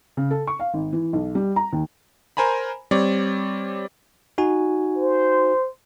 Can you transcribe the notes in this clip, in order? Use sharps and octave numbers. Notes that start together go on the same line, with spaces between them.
C#3
A4
C#6
F5
G#1
E3
B1
G3
A#5
D#2
A#4 C5 G#5 A#5 B5
G3 C4 C#5 D5
D#4 F#4 G#5
C5